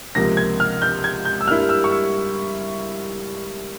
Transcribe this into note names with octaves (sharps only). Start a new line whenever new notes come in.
C#2 C3 F3 A#3 A#6
G#6
F6
G6
G#6
G6
E6
G2 G3 A#3 E4 F6
E6
C#6
E6